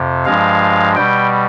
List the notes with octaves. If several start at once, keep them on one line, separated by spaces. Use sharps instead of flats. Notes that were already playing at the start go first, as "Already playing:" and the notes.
Already playing: F2 C3
G2 F3 G#3 F5
B2 G3 G5